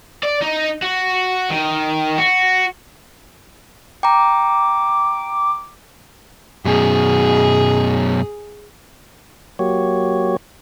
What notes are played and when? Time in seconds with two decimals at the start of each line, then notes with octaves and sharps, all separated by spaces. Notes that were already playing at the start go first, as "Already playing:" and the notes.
0.23 D5
0.42 D#4
0.82 F#4
1.50 D#3
2.18 F#4
4.03 G5 A#5 D6
6.65 F#2 B2 G#4
9.59 F#3 A#3 F#4 G4 C#5